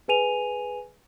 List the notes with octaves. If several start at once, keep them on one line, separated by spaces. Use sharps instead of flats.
G#4 B4 G#5 D#7 F7